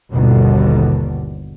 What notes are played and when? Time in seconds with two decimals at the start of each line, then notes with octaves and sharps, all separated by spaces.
0.12 G1 D#2 B2 D3